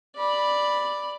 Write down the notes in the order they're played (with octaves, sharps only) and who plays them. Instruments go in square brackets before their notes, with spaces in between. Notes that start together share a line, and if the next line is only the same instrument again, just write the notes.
[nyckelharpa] D5 B5